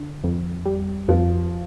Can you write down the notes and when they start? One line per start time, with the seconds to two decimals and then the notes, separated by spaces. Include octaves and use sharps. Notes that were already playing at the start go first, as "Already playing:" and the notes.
Already playing: D3
0.24 F2
0.66 G3
1.08 F2 F3